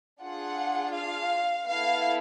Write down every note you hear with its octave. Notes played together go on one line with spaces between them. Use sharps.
D4 F4 G#4 F#5
F5
B3 E4 A4 F5